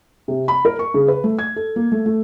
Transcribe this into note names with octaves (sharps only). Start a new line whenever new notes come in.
C3
B5
A#4
C#6
C#3
B4
A3
G#6
A4
A#3
A3
A3